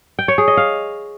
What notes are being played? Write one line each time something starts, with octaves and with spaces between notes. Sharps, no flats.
G5
C#5
G#4
D#5
F5